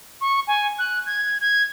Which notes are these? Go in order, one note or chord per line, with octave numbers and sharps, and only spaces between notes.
C#6
G#5
F#6
G#6
G#6